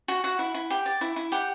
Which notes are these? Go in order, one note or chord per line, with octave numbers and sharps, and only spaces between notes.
F#4
F#4 F#5
E4
E4
G4
D5
E4
E4
G4 F#5